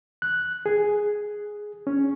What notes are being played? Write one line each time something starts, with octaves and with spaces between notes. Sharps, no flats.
F#6
G#4
C#4